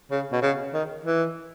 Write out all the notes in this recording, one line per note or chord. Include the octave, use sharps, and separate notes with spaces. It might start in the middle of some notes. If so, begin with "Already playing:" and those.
C#3
B2
C#3
D#3
E3